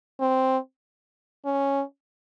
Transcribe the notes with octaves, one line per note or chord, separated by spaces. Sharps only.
C4
C#4